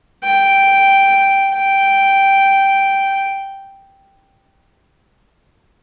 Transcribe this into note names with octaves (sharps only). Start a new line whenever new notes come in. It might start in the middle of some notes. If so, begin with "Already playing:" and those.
G5
G5